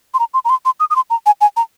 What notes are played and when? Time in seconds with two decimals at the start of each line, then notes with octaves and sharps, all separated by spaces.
0.14 C6
0.19 A#5
0.34 C6
0.45 A#5
0.50 C6
0.65 C6
0.80 D#6
0.90 D#6
0.96 C6
1.10 A#5
1.26 G#5
1.41 G#5
1.57 A#5